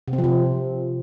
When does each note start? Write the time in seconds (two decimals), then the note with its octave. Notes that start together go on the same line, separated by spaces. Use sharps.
0.08 C3
0.13 C4
0.18 F3
0.24 C3